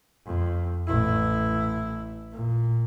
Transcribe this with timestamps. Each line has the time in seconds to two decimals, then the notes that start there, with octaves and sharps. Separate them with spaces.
0.25 F2
0.87 A1 E4
2.32 A#2